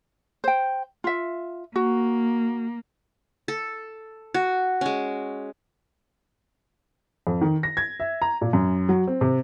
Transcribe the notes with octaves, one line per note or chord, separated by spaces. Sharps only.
C5 G5
F4 E5
A#3 F#4
A4
F#4
G#3 C#4
F2
D#3
A#6
G#6
E5
A#5
A#2
F#2
F#3
C4
C3